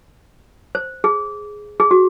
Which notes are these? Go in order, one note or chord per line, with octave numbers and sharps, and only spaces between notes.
C5
G#4
G#4
F#4